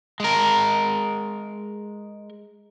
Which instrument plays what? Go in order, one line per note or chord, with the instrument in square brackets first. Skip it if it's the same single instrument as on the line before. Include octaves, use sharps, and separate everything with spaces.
[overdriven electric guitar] G#3 A#4